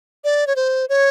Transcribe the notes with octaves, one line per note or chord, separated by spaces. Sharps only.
D5
C#5
C5
C#5